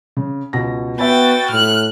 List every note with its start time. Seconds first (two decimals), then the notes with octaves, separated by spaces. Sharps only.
0.17 C#3
0.53 C#2 B2 A#6
0.99 B3 F#4 E5 G5 G#5 B5 A6
1.50 A2 F6 F#6